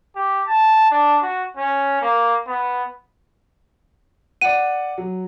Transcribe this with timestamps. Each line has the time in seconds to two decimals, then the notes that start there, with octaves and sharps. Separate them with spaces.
0.15 G4
0.47 A5
0.91 D4
1.22 F#4
1.57 C#4
2.02 A#3
2.47 B3
4.41 D5 F#5 D#7
4.98 F#3